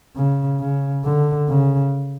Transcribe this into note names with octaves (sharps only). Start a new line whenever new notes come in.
C#3
C#3
D3
C#3